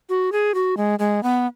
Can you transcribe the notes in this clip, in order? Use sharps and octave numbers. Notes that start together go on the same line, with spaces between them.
F#4
G#4
F#4
G#3
G#3
B3